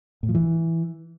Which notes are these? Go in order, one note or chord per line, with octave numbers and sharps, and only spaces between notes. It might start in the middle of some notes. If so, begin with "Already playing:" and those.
A2
F3
E3